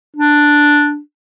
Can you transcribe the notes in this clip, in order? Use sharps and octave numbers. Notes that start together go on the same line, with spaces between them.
D4